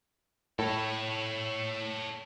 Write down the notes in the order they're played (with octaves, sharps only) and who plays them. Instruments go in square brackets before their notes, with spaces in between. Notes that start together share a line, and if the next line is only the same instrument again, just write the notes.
[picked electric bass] A2 [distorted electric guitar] A4 C#5